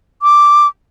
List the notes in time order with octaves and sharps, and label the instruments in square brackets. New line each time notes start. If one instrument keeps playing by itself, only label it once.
[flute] D6